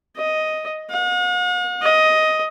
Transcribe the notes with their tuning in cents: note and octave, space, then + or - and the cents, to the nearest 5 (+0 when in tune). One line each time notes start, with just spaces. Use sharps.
D#5 +5
F#5 -45
D#5 +10